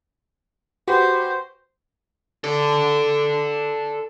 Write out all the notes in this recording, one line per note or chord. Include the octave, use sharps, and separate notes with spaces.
F#4 G4 B4 C5
A4 D5